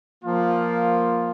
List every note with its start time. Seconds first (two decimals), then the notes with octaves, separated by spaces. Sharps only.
0.24 F3 A#3 F4